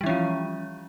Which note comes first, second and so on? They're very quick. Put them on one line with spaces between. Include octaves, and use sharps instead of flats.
G3 E3 C#4 F3